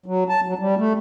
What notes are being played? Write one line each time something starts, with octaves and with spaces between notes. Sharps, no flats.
F#3
A5
F#3
G3
A3